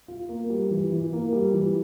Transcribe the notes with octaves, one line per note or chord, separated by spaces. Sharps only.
F4
A#3
G3
E3
E3
A#3
G3
E3